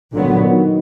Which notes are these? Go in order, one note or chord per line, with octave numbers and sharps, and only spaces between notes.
A#2 D3 F#3 B3
D#3